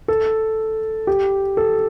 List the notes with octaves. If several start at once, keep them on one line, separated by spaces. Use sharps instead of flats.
A4
G4
A4